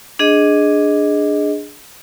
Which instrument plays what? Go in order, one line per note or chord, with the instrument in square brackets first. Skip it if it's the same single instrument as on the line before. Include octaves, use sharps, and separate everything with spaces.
[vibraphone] D4 G#4 D#5